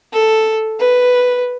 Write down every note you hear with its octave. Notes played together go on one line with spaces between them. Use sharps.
A4
B4